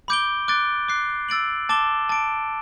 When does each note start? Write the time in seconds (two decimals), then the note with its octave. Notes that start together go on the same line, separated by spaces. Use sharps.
0.08 B5 D6 G6 D7 G7
0.48 D6 F#6 A6 D7 G7
0.88 D6 F#6 C7
1.29 E6 A6 D7 F#7
1.69 A5 D6 A6 E7 G7
2.09 A5 D6 A6 D7